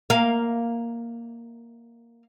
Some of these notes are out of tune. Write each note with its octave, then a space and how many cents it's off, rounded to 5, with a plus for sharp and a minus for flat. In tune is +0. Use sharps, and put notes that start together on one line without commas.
A#3 +0 F5 +0